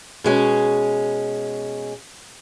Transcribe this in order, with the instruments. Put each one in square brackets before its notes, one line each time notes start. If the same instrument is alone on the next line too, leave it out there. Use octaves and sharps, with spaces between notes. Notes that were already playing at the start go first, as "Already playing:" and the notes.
[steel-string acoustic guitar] B2 G#3 C#4